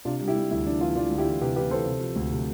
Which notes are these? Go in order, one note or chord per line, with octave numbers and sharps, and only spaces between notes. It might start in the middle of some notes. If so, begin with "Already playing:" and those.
C3 D4 F4
G3
E4 G4
G3
D2 E4
E3 D4
E3 D4 F4
E3 D4 F4
D2
E4 G4
E3
C3 G4 B4
E3 G4 B4
E3 A4 C5
C3
F3
D2
C3